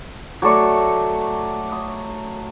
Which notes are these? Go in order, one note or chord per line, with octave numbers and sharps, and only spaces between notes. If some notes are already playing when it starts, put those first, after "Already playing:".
F#3 A3 D5 C#6
D#6